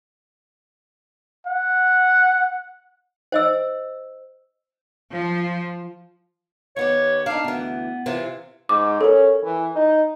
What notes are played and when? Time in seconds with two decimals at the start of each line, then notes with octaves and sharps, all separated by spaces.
1.47 F#5
3.32 C5 D#5 E6
5.11 F3
6.76 D#2 B3 G4 C#5
7.26 D4 D#4 F5
7.44 D2 E3 B3
8.06 C3 E3 F4
8.69 G#2 D6
9.01 C#4 A4 A#4
9.44 E3
9.76 D#4